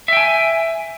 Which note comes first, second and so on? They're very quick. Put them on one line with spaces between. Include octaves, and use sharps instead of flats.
E5 G5 G#5